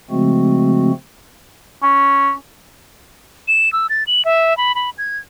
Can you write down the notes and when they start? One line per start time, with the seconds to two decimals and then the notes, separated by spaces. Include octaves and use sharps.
0.11 C#3 F3 G#3 A3 C4 F#4
1.83 C#4
3.48 E7
3.73 E6
3.90 A6
4.07 F#7
4.25 E5
4.57 B5
4.75 B5
4.98 G#6